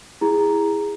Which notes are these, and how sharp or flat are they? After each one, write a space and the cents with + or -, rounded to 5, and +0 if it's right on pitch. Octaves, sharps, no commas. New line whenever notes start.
E4 +0 G#4 -20 A#5 +0